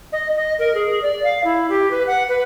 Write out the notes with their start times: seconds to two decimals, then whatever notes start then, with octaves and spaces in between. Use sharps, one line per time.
0.12 D#5
0.36 D#5
0.59 A#4
0.74 G#4
1.02 D5
1.24 F5
1.44 E4
1.70 G4
1.91 B4
2.07 F#5
2.29 B4